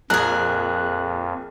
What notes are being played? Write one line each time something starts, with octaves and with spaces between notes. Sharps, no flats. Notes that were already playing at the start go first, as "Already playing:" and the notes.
A#1 F2 G#4 A#4 F#6